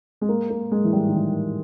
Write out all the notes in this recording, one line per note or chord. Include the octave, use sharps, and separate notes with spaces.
G#3
A#3
A#3
G#3
E3
G3
D#3
E3